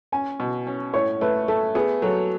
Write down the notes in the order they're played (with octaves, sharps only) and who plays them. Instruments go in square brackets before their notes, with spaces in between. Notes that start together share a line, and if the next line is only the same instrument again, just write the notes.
[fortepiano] C#4 [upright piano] G#5
[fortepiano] B2
C#4
[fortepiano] A2 [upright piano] C#5
[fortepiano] A3 [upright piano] B4
[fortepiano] A3 [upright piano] A4
[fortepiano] B3 [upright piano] G#4
[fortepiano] F#3 [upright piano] A4